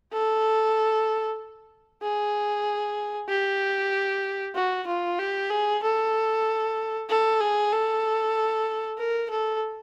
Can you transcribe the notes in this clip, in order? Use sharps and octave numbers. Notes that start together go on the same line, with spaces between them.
A4
G#4
G4
F#4
F4
G4
G#4
A4
A4
G#4
A4
A#4
A4